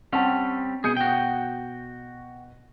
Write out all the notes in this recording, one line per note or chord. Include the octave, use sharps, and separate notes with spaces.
G3 C4 C#4 F#5 A5
B2 G#4 G6 C#7
F#4 G5